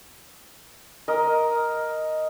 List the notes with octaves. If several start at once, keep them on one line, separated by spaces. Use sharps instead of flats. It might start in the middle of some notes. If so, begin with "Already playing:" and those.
A#4 D#5